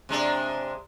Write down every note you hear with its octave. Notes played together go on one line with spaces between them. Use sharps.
C3 G#3 D4